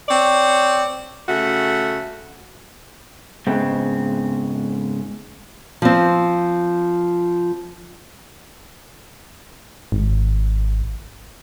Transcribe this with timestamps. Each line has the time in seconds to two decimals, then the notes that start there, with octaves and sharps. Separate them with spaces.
0.09 C4 C#5 D5
1.29 C#3 A3 F#4
3.47 G#2 C#3 B3 C4
5.82 F3 C4
9.92 G#1